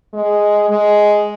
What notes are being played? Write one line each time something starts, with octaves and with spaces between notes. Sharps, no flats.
G#3
G#3